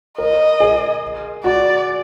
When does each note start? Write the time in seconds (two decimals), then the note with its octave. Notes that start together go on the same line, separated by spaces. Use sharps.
0.18 A#4 D#5
0.60 G#4
1.44 F#4 D5